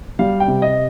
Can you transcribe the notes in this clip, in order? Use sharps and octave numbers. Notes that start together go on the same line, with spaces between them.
G3 F5
G5
C3
D#5